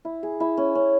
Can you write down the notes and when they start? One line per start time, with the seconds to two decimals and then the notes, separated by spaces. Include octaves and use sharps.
0.05 E4
0.23 G#4
0.40 E4
0.57 C#4
0.75 C#4